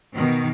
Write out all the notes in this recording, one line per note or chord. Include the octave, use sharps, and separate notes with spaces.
B2 D#3